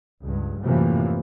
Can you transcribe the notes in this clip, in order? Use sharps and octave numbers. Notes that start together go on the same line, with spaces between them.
C#2 G2
F#2 A2 C3 E3 F3 A#3